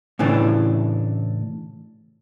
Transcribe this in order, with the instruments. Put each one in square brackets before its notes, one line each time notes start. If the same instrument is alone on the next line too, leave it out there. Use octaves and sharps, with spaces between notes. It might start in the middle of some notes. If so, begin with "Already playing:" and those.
[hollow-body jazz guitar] A2 C#3 E3 D4